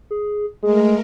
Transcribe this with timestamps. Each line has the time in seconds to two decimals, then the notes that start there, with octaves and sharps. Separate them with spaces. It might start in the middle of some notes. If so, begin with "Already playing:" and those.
0.11 G#4
0.63 G#3 A3 G#4 A#4